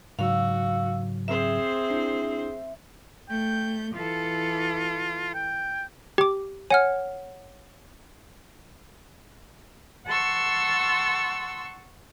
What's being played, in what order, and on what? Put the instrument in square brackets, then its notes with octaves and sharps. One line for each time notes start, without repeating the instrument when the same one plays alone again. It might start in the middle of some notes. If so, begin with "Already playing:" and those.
[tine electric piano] G#2 C#3 F#3 [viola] F#4 [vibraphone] F5 E6
[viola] C4 C5 [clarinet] G#4 [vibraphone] E5
[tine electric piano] D4 E4
[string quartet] A3 G6 [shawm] G5
[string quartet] E3 A4 [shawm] F4
[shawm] G5
[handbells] G4 D6
[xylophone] C#5 F#5 F6 [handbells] G#5
[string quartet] F#5 A5 C6 C#6 E6